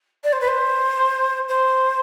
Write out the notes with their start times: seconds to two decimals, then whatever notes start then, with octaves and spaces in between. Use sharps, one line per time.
0.24 D5
0.33 C5
0.41 B4
0.48 C5
1.49 C5